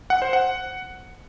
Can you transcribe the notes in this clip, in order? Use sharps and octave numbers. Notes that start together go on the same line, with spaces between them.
F#5
C5
F#5